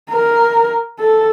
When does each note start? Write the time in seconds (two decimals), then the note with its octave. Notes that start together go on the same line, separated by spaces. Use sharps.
0.10 A#4
0.99 A4